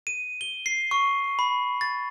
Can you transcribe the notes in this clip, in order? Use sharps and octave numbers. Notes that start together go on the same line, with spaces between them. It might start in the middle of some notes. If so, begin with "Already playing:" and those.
D#7
G7
C7
C#6
B5
A6